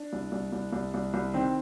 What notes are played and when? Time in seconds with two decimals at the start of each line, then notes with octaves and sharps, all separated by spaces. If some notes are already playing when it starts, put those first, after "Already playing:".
Already playing: D4
0.13 C2
0.32 C2
0.53 C2
0.73 C2
0.94 C2
1.14 C2
1.34 D#3 C4